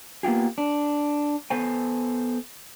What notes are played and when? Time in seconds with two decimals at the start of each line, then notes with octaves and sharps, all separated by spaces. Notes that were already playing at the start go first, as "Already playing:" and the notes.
0.23 A#3 B3 F4 G4 G#4
0.58 D4
1.50 B3 A4 C5 G#5